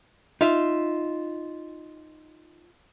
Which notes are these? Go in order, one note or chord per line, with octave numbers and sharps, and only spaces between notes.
D#4 F4 E5